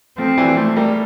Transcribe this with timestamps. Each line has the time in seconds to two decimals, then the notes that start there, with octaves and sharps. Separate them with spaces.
0.18 F3 A3 C4
0.37 E3 G3
0.57 A3
0.76 G3 A#3